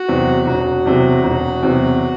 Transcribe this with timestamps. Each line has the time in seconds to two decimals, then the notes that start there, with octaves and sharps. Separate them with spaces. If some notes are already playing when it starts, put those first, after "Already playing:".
Already playing: F#4
0.08 E2 C3 F#3 C4
0.47 E1 F#4
0.86 E2 C3 F#3 C4
1.24 E1
1.63 E2 C3 F#3 C4